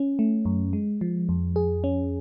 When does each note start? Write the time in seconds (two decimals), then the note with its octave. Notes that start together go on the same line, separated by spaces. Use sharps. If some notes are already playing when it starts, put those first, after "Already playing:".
Already playing: C#4
0.19 A3
0.45 F#2
0.73 G#3
1.01 F3
1.29 F2
1.56 G#4
1.84 C#4